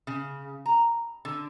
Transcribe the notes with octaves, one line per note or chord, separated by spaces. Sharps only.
C#3
A#5
D3